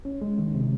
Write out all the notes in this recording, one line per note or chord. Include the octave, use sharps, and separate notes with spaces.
C#4
G#3
D#3
C3